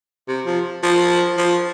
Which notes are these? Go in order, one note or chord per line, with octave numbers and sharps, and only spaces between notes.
C3
F3
F3
F3